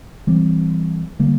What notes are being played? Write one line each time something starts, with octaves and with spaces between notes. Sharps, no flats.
E3 G3 C4
D3 G3 A#3